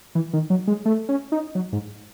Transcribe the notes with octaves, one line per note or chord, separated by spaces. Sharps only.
E3
D#3
F#3
G#3
A3
C#4
D#4
F#3
G#2